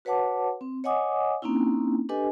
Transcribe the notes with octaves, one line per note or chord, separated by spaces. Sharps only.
F#4 B4 C#5 F#5 A5 D6
C4
C#5 D#5 F#5 G#5 D6 D#6
A#3 C4 C#4 D#4 E4
D4 G4 A4 B4 D#5 G#5